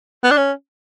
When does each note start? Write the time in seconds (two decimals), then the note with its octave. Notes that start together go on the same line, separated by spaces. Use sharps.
0.23 B3
0.31 D4
0.37 C#4